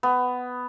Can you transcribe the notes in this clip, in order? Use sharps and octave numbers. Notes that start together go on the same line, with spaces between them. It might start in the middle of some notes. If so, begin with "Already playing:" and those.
B3